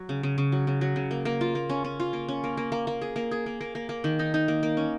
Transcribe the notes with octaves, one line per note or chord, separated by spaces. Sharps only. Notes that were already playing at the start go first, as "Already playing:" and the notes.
Already playing: F#3
C#3
C#3
C#3
F#3
C#3
F#3
C#3
A#3
A#3
F4
A#3
C#4
C#4
F4
A#3
C#4
A#3
A#3
A#3
A#3
G#4
A#3
G#4
A#3
A#3
A#3
A#3
D#3
D#4
D#4
A#3
A#3
C#4